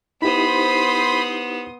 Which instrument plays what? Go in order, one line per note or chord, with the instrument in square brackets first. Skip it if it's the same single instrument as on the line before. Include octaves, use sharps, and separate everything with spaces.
[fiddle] B3 [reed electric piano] D#4 E4 G4 [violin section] C5 C6 D#6 [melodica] B5